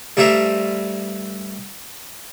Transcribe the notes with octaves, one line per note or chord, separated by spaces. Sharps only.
G2 G3 A3 C5 E5 A#5